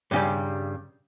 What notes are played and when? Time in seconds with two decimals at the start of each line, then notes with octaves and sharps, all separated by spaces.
0.11 G2 C#3 G3